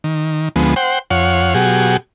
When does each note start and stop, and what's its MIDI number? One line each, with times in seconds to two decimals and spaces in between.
0.04 0.49 51
0.56 0.74 38
0.56 0.74 53
0.56 0.74 56
0.56 0.74 59
0.76 0.99 72
0.76 0.99 78
0.76 0.99 79
1.11 1.54 41
1.11 1.54 73
1.11 1.54 77
1.11 1.54 78
1.54 1.97 47
1.54 1.97 54
1.54 1.97 67
1.54 1.97 68
1.54 1.97 78